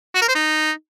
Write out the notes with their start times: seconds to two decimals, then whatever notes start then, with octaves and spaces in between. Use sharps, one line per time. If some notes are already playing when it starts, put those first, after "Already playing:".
0.15 F#4
0.21 A#4
0.28 C5
0.35 D#4